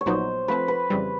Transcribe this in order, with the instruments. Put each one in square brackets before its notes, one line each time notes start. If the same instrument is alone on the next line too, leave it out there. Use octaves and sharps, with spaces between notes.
[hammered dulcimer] C#5
[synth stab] A#1 A#2 F#3 B3 D#4 [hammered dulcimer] C5
[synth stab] F3 A3 C4 [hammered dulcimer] B4
[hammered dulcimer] B4
[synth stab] F2 C#3 E3 G3